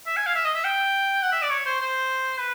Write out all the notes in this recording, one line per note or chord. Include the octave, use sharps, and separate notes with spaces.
E5
G#5
F5
E5
D#5
E5
G5
F#5
E5
D5
C#5
C5
C5
B4